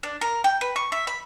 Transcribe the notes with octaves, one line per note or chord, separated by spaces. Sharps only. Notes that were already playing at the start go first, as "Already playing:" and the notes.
D4
A#4
G5
B4
C#6
E5
B5